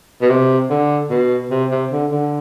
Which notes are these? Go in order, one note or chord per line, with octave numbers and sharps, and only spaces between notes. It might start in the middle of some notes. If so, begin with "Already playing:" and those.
B2
C3
D3
B2
C3
C3
D3
D3